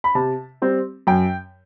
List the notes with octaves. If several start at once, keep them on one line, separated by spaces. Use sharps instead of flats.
B5
C3 A5
G3 C4
F#2 G5